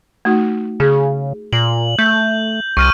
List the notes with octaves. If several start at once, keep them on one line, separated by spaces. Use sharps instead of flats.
A3 D#4 F#4
C#3 G#4
A#2 F#7
A3 G6
C2 C#6 F6 D#7